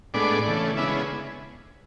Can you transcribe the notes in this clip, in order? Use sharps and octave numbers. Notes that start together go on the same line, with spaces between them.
A2 G#3 B3 D4 D5
C#3 E3 A3
C#3 G#3 B3 D4 E4 E5